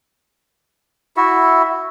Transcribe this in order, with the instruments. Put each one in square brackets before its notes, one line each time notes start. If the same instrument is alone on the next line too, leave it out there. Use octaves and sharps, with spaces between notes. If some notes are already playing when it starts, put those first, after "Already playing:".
[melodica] E4 F#4 E5